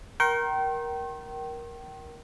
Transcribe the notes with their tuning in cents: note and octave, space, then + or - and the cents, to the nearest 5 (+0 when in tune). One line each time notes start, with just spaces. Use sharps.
A#4 +15 G5 -30 C6 +45